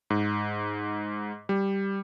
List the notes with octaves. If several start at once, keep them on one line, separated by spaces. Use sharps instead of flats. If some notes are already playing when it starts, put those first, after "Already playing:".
G#2
G3